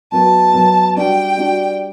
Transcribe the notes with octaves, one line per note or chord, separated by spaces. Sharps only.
F#3 B3 F#4 A5
F#3 B3 F#4
G3 D4 F#4 G5
G3 D4 F#4